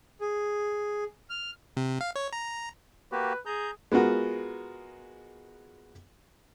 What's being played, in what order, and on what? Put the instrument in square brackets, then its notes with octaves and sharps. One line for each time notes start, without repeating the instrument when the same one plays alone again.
[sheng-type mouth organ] G#4
F6
[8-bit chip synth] C3
F5
C#5
A#5
[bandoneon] A#3 F#4 G4 [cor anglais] B4
[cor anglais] G#4 [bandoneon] A#5 G6
[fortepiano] G#3 B3 F4 F#4 A#4